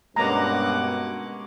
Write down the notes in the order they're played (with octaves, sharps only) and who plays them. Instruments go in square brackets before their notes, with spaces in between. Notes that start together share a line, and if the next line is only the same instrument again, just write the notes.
[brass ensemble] G2 B2 [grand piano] G#3 A#3 C#4 [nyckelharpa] F#5 D6 [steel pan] A#5